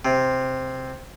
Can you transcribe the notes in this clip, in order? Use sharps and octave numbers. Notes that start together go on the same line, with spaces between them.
C3